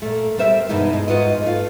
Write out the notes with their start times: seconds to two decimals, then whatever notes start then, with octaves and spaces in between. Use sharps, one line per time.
0.02 A#2 A3
0.38 G3 A#4 C5 E5
0.69 E2 G2 B2 E3 G#3 D#4
0.93 G#3
1.08 G#2 F4 F#4 B4 D#5
1.43 A3 F4